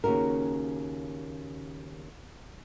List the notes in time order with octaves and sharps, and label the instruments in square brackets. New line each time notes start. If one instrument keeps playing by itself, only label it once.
[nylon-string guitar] D#2 C#3 C#4 F#4 A#4